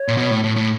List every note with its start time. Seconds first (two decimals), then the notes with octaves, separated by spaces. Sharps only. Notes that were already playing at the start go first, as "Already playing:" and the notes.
Already playing: C#5
0.08 A#2
0.17 B2
0.31 A2
0.44 A2
0.56 A2